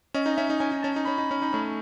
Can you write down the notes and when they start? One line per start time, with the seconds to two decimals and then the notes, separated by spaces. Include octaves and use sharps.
0.14 C#4 D#5
0.26 D#4 D#5
0.37 C#4 E5
0.50 D#4
0.60 C#4 G#5
0.72 D#4
0.83 C#4 A5
0.96 D#4
1.05 C#4 B5
1.18 D#4
1.31 C#4
1.42 D#4
1.53 A3 C#4